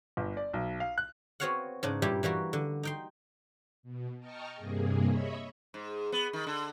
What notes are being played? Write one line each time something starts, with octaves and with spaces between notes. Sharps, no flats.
G1
D5
B1
F5
F#6
B3 C4 F#4 C#5 F5 F#5
G#2 C#3 D4
G2 A#2 G3 E4 G4
E3 G3 A#3 F#4
D3
D#4 G5 C6
B2
D#5 G5 A5 A#5 C#6 F6
G2 C3 A#3 G#4
C#5 D#5 E5 B5 C#6
G#2
B3
D#3
D3